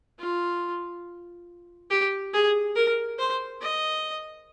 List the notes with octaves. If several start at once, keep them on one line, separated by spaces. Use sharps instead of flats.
F4
G4
G#4
A#4
C5
D#5